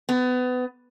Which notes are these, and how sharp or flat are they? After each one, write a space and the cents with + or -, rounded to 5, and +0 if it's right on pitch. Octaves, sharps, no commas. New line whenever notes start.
B3 +25